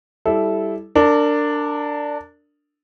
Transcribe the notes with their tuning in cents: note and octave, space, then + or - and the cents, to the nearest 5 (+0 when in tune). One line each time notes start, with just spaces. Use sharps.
G3 +0 E4 +0 A4 -15
D4 +0 A#4 -30